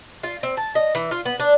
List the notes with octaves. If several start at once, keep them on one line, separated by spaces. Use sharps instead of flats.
F4
C4
A5
D#5
E3
F4
B3
D4